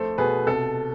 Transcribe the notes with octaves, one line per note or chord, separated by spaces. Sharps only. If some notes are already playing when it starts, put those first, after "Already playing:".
Already playing: F2 A3 A4 C5
B2 G#4 B4
C3 A4